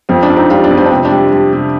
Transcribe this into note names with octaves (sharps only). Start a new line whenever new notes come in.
F2 C4
D4
F2
C4 D#4
G3 D4 F4
D4
F2
C4
D4
C3 C4
D4
G3
G3
C3